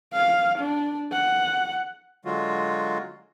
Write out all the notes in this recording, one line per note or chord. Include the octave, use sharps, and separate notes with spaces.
F5
D4
F#5
D3 F#3 G#3 F4 F#4